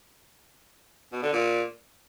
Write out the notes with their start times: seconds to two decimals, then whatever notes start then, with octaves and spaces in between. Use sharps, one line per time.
1.12 B2
1.22 D3
1.33 A#2